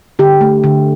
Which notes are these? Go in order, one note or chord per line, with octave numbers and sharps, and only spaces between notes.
D3 G4
A3
D3